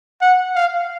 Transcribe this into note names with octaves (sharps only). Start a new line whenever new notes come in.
F#5
F5